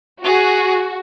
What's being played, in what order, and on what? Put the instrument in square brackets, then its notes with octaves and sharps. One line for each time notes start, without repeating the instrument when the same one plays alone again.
[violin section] F#4 [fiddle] G#4